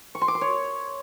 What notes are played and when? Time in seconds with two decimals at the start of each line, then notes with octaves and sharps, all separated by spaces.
0.15 C#6
0.21 C6
0.28 D6
0.35 C6
0.41 C#5